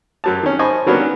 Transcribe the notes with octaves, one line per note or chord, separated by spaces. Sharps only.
F#2 F#3 A5
D#3 C#4
C5 D#5 G#5 A5 B5 C#6
D#3 F#3 A#3 B3 C#4 D4